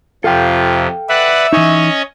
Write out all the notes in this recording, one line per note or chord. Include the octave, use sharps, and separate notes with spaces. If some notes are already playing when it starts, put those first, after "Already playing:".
F2 C3 F4 A4 F5 G5
B4 D5 E5 F#5
E3 C#4 D#4 C#5 D#5